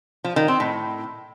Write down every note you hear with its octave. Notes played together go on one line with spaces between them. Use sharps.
F3
D#3
C4
A2